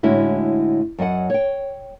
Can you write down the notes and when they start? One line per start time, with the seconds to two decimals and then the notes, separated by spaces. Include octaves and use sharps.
0.03 A2 D3 G#3 C#4 E4 F#4
0.99 F#2 F#3 D#5 F#5
1.30 C#5 G5